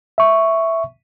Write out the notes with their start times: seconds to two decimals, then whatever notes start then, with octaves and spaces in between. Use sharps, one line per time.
0.18 E5 C#6